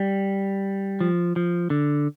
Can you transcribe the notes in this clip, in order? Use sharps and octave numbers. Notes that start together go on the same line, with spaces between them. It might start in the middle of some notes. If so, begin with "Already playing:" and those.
Already playing: G3
F3
F3
D3